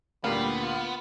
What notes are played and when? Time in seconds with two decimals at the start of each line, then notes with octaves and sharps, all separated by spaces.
0.24 D2 A#2 D3 G3 B3 A#4 F5
0.63 F4